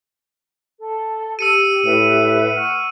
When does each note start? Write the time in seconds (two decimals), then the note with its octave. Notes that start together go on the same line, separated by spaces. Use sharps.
0.79 A4
1.39 G4 E6 C#7 D#7
1.85 A2 B4 E5
2.56 F#5 C#6 F6